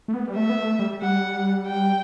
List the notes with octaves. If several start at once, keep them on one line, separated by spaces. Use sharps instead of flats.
A3
B3
G3
A3 E5
B3
A3
G3
G3 F#5
G5